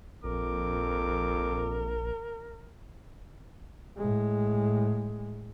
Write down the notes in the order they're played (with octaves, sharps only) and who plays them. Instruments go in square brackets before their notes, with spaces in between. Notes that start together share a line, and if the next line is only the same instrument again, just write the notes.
[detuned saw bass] A#1 [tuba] F2 [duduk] A#4 [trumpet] D6
[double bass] A2 G#3